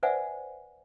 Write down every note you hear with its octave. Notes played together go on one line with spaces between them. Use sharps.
B4 C5 D5 E5 F#5 G#5